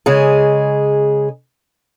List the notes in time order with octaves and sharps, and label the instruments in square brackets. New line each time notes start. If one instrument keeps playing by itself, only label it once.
[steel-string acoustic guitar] C#3 G#3 G#4